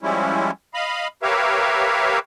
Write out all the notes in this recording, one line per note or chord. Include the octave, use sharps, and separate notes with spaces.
F3 G3 G#3 C#4 E4
D#5 F5 B5
G4 A#4 B4 C#5 E5 F5